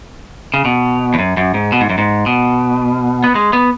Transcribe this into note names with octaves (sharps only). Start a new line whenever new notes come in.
C#3
B2
E2
F#2
F#2
G#2
B2
G#2
F#2
G#2
B2
B3
G#3
B3